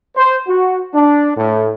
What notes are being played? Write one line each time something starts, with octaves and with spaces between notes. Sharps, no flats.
C5
F#4
D4
A2